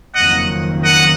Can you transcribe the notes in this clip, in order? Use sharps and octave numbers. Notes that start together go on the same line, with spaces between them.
F#1 F2 D#3 F#3 A#3 D#5 F#5
D#5 F#5